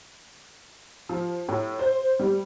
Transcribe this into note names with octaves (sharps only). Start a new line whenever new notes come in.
F3
A2
C5
G3